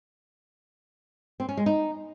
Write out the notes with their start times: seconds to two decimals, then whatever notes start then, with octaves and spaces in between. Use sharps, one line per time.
1.40 C4
1.49 C#4
1.57 G#3
1.66 D#4